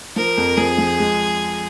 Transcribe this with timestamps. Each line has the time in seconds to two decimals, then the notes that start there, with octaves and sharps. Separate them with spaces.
0.16 F3 A#4
0.38 F2
0.57 F3 G#4
0.78 F3
0.99 G#3